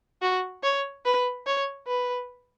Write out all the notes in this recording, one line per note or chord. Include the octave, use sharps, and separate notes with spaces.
F#4
C#5
B4
C#5
B4